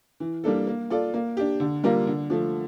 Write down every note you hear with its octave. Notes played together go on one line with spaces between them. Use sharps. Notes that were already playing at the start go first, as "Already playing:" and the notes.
E3
G3 A#3 D4 A4
A#3
F4 A4 D5
A#3
D4 G4
D3
G3 A#3 F4 A#4
D3
F3 A3